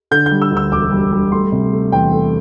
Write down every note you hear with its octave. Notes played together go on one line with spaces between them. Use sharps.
D3 G6
G6
G3
E6
D2
E6
E1 D6
G3
G3
A3 C6
C3
A3
E2 G5
A3